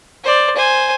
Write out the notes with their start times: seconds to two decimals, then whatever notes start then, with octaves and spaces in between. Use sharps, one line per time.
0.24 C5 D5
0.56 C5 G#5